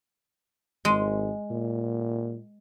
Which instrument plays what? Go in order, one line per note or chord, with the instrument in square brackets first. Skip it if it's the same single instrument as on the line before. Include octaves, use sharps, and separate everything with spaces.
[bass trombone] G#1 [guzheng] G#3
[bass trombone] A#2